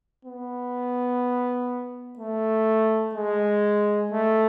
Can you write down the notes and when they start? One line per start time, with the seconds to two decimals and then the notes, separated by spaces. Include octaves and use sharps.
0.25 B3
2.19 A3
3.15 G#3
4.12 A3